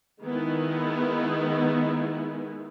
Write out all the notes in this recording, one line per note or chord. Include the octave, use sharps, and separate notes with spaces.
D#3 G#3 B3 D#4 E4